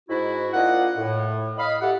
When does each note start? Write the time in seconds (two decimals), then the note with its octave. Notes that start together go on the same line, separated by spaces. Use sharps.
0.09 G#2 E4 F#4
0.54 A#3 D4 F4 D#5 F#5
0.97 A2
1.58 D#5 F5 B5
1.81 E4 F#4 G4 A4 F#5